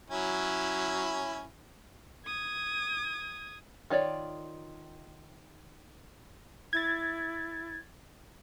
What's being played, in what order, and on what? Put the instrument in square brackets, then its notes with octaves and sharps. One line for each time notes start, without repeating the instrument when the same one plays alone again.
[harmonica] F#3 C#4 E4
[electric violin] D#6 G#6
[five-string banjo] D#3 F4 C#5 D5
[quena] E4 [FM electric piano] G#6 A6